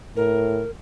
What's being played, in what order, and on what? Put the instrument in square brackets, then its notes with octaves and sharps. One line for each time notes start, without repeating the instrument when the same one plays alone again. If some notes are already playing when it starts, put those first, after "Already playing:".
[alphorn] A2 [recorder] A#4